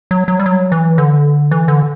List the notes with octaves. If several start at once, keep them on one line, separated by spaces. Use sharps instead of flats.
F#3
F#3
G3
F#3
E3
D3
E3
D3